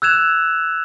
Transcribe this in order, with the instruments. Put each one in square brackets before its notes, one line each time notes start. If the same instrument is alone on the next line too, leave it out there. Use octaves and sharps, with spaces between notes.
[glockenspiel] E6 F#6 G#6 E7 F7